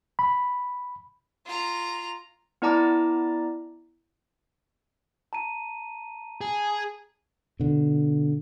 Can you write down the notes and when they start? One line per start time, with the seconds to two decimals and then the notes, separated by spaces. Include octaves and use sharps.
0.19 B5
1.46 F4 A#5
2.62 B3 E4 D5 A5 A#5 D6
5.33 A5 A#5 D#7
6.41 G#4
7.60 B2 D3